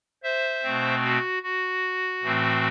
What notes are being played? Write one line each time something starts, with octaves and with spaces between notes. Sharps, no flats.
C5 E5
B2 A3 C4
F#4
F#4
A2 E3 A3 C4